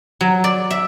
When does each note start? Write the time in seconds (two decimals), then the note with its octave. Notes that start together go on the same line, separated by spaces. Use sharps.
0.21 F#3
0.44 D5
0.71 E5